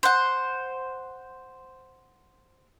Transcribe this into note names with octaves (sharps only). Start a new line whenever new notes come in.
C5 F#5